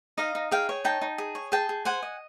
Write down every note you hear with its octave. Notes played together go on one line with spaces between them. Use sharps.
D#4 D#5 F5
D#4
G#4 F5 G5
C#5
D#4 G5 A5
D#4
G#4
C#5
G#4 G5 A5
G#4
C5 F#5 G#5
D#5